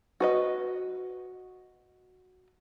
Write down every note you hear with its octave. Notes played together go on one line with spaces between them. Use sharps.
F#4 B4 D#5